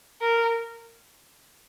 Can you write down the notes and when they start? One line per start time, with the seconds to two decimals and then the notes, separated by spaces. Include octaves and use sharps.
0.21 A#4